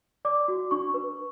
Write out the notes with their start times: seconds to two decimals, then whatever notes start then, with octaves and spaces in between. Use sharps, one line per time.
0.25 D5 D6
0.48 F#4
0.71 D4 C#6
0.94 B4